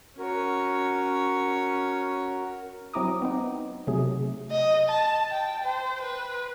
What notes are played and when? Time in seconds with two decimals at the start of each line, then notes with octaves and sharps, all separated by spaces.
0.19 C#4 F#4 A#4 C#5
2.94 F#3 C4 E4 A#5 D6 D#6
3.22 B3 C4 D#4
3.87 C3 F#3 A3 G#4
4.51 D#5
4.89 A5
5.30 G5
5.64 C5
6.02 B4